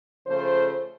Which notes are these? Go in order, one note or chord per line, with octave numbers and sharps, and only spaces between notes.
C#3 F3 A3 C5